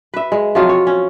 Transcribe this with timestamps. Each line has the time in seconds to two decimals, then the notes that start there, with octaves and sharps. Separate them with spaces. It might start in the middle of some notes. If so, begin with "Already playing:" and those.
0.14 B4 E5
0.32 G#3
0.55 C3 F3 F#3 F4
0.69 C#5
0.87 C#4